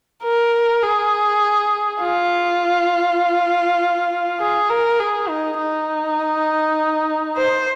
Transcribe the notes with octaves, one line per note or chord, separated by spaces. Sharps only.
A#4
G#4
F4
G#4
A#4
G#4
D#4
D#4
C5